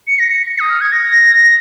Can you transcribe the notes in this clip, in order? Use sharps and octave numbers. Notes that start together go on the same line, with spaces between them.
C#7
A#6
C#7
D#6
F6
G#6
A#6